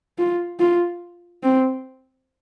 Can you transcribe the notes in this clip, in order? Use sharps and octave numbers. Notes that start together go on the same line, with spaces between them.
F4
F4
C4